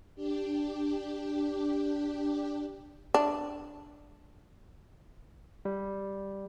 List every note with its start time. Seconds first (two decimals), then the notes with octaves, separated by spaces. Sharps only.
0.15 D4 G4
3.14 D4
5.65 G3